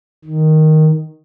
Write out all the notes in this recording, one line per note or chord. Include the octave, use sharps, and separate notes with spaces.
D#3